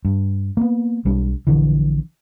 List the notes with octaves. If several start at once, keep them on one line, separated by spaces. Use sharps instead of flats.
G2
A#3 B3
B1 G3 D4
A#1 D3 E3